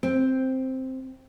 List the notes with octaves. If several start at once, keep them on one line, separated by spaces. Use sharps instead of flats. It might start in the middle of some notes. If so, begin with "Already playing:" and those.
C4